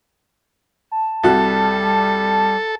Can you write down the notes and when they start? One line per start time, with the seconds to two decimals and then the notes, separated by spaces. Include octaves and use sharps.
0.92 A5
1.23 C2 G3 F#4 A4